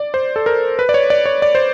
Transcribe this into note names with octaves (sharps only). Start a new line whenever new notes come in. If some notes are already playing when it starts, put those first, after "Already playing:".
Already playing: D5
C5
A4
A#4
B4
D5
C#5
D5
C#5
D5
C5